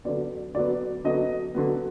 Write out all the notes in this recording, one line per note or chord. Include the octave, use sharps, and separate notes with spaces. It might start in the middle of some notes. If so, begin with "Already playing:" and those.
D3 F#3 B3 D5
D3 F#3 B3 D5
D3 F#3 B3 D#5
D3 F#3 B3